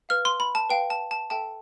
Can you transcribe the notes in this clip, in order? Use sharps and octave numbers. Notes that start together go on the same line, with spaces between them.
B4 F5 F6
C6
B5
A5
B4 F5 G5
A5
A5
A4 E5 G5 A5